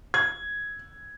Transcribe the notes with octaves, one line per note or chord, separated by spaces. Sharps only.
G#6